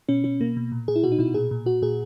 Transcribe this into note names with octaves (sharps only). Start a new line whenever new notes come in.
B2 C#4
B2 C#4
B2 A#3
B2
A#2
A#2 G#4
E4
B2 F#4
D#4
B2 E4
A#2 G#4
A#2
A#2 F#4
A#2 G#4